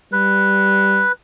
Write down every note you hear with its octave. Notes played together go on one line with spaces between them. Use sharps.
G3 B4